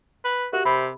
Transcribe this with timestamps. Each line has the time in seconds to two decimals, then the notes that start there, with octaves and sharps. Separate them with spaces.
0.24 B4
0.53 F#4 G4 A#4 E5
0.65 C3 B5